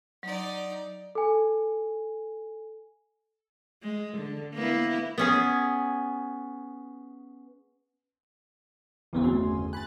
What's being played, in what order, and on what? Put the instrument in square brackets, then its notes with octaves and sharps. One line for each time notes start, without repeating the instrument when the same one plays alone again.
[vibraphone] F#3 [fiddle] D#4 D5
[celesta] A4 G#5
[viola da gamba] G#3
D3
A#3 B3 E4
[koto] B3 C#4 G#4
[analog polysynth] G1 E2 C#3 [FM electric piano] E3 B3 C4
[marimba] A3 C4 F#4 [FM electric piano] G#5 C6
[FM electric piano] G#5 B5 [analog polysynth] F#6 A6